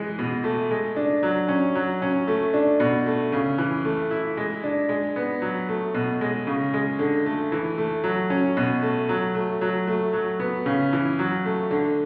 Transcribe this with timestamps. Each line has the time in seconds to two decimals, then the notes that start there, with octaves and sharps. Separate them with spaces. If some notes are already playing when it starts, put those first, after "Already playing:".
Already playing: E3 G#3
0.19 B2
0.44 A3
0.71 G#3
0.96 D4
1.23 F#3
1.48 C#4
1.75 F#3
2.02 C#4
2.27 A3
2.54 D4
2.80 B2
3.06 A3
3.32 C#3
3.58 E3
3.85 A3
4.11 E4
4.37 G#3
4.64 D4
4.89 G#3
5.16 B3
5.42 F#3
5.69 A3
5.94 B2
6.21 G#3
6.47 C#3
6.74 G#3
6.99 D3
7.26 A3
7.52 E3
7.78 A3
8.04 F#3
8.30 C#4
8.57 B2
8.82 A3
9.09 F#3
9.35 A3
9.61 F#3
9.87 A3
10.13 F#3
10.40 B3
10.66 C#3
10.93 E3
11.19 F#3
11.45 A3
11.71 D3